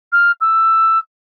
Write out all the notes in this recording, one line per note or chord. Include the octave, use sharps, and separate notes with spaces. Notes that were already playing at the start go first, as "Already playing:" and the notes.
F6
E6